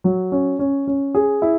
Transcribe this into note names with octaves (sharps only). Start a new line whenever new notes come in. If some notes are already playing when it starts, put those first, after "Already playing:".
F#3
C#4
C#4
C#4
G#4
E4